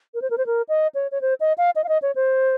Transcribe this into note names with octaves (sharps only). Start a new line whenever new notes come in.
A#4
C5
A#4
C5
A#4
D#5
C#5
C#5
C5
D#5
F5
D#5
F5
D#5
C#5
C5